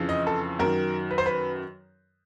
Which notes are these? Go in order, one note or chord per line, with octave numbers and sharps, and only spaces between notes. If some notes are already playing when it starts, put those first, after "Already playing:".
Already playing: F2 C#3 E3
D#5
A4
F#2 D#3 A#4
B4
C5
B4